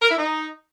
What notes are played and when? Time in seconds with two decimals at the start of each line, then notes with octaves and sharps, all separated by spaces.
0.02 A#4
0.10 E4
0.18 D#4